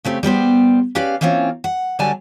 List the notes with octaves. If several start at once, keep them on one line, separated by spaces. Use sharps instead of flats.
C#3 A3 C4 G4
G3 B3 G4 C5
C#4 G4 B4 D5 F5
E3 A#3 C4 C#4 F4
F#5
D3 F#3 G3 D5 G#5 A5